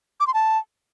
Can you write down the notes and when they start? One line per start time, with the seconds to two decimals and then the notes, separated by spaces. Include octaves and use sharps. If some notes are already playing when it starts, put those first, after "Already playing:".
0.20 D6
0.27 C6
0.34 A5